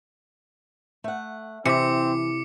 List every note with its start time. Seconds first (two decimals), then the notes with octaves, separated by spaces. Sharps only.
1.04 A3 F#5
1.66 C3 E3 C4 D6 C#7